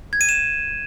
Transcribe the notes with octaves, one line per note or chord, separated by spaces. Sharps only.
G#6
D#7
E7